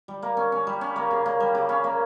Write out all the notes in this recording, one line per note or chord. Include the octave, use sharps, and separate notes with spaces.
G3
A#3
C#4
C#4
G3
C#4
A#3
C#3
A#3
G3
C#3
C#4
A#3